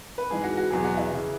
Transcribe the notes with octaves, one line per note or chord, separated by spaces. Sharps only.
B4
G#2 E3 G#3 G#4
F#4
F#4
E2 B2 F#3 G#4
F#4
E4
C#3 E3